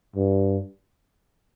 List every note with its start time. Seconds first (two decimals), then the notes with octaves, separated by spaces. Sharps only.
0.16 G2